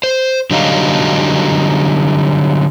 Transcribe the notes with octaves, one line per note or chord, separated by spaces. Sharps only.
C5
D3 F#3 G3 D#4 F#4 F5